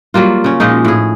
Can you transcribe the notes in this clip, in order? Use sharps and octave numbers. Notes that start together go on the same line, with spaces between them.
F#3 G3 A#3 F4
C#3 C#4
A#2 F3 G#3 D#4
A2 G#4